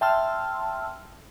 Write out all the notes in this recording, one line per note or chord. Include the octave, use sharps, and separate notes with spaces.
E5 G5 A5 C6 E6 F6